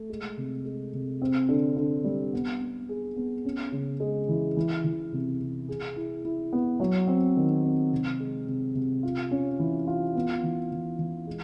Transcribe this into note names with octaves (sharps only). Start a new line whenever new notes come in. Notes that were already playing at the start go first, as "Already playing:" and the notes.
Already playing: A3
G#3
C3
G#3
C3
C4
D3
D3
G3
B3
B3
G#4
B3
C#4
C#3
G#3
E3
E3
E3
C3
C3
G#4
E4
E4
B3
F#3
C4
D#3
C4
C3
G#3
C3
C3
F4
C#4
E3
F4
B3
E3
E3
E3
G#3